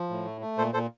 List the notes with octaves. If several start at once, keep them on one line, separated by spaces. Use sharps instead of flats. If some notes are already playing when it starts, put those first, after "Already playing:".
Already playing: F3
A2
A3
A3
A#2 A4 C5
A#2 A4 C5